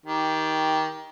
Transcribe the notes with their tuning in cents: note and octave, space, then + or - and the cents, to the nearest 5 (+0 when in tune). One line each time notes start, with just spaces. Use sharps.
D#3 +20 G4 +0